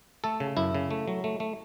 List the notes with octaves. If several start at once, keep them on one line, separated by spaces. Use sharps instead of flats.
A3 A4
C#3
F#2 E4
C#3
A3
F#3
A3
A3